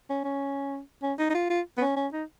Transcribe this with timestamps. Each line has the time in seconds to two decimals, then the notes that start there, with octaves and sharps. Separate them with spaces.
0.10 C#4
0.24 C#4
1.02 C#4
1.19 D#4
1.30 D#4
1.34 F4
1.50 F4
1.78 B3
1.81 C#4
1.96 C#4
2.13 D#4